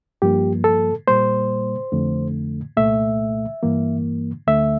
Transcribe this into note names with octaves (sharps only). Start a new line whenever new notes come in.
G2 F3 A#3 G4
A4
A#2 G3 A#3 C5
F2 D3 A3
C2 A#2 A3 E5
G2 E3 A#3
D2 D3 A3 E5